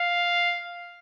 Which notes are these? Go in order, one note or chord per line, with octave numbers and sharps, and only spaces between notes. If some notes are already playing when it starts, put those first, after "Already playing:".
Already playing: F5